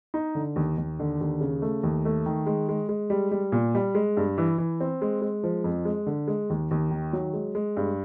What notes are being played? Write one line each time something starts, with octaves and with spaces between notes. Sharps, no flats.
D#4
D3
D#2
D#2
D3
D#2
C#3
A3
D#2
A3
D#3
G#3
G#3
G#3
G3
G3
A#2
G3
G#3
G2
E3
E3
C4
G#3
G#3
F3
F2
G#3
D3
G#3
D#2
D#2
D#3
F#3
G#3
G#3
G2